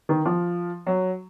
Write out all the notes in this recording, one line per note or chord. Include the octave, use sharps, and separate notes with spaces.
D#3
F3
F#3